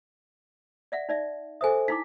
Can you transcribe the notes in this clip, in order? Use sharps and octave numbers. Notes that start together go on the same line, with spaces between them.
D5 E5 F#5
D#4 D5 E5
A4 C5 E5 G#5 D#6
D#4 E4 D6 B6